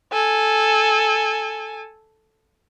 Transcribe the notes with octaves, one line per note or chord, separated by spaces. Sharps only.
A4 G#5